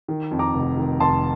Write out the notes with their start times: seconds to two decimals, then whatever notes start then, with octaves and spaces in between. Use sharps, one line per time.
0.08 D#3
0.31 F2
0.39 A#5 D6
0.54 F1
0.77 D#3
1.00 F1 A5 C6